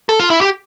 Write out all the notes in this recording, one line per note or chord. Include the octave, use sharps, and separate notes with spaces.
A4
F4
E4
G4